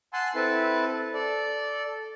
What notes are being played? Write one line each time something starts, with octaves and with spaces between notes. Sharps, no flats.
F#5 G#5 A5 C6 E6
C4 E4 A4 B4 A5
A4 D5